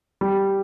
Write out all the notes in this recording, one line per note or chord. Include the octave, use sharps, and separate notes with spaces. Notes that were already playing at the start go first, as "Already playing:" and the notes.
G3